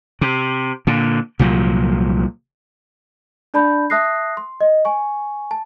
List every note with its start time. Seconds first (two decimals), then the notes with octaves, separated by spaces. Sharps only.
0.21 C3
0.87 A#2 D3
1.39 C2 A#2 F3 F#3
3.54 D4 D5 A5 B5 G6
3.90 E5 A5 D#6 F#6 A#6 C7
4.37 C6
4.61 D#5
4.85 G#5 C#6
5.51 A5